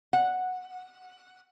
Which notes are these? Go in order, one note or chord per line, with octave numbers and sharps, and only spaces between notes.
F#5